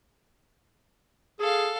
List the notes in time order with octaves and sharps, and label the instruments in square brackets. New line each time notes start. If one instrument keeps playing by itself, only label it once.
[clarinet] G#4 [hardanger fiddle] A4 F5